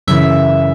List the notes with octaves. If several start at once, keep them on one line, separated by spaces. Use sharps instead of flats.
F#2 C#3 E3 E5